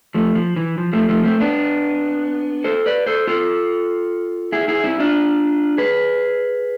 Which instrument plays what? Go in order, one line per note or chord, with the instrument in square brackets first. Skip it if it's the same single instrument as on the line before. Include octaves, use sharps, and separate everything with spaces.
[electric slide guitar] F3 A3
F3
E3
F3
F3 A3
F3 A3
A3 C4
B3 D4
A4 C5
B4 D5
A4 C5
F4 A4
E4 G#4
E4 G#4
C4 E4
D4 F4
G#4 B4